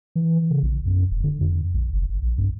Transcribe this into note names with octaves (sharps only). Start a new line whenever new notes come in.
E3
C#3
A#1
F#2
E1
D3
F2
A#1
F#1
G1
A#1
G2